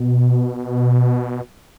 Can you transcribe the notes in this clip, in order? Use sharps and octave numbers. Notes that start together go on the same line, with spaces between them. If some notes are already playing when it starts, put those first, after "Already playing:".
Already playing: B2